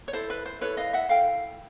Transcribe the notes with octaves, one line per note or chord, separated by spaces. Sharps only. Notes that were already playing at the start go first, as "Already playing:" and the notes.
C#5
E4 A4 C5
B4
C5
E4 A4 B4 C#5
D#5 F5
E5 F#5
E4 A4 F5 G5